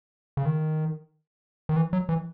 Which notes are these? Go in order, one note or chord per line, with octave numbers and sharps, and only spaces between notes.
C#3
D#3
D#3
E3
F#3
E3